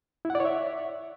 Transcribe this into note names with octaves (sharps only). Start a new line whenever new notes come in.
E4
F#5
D5
C#5
E5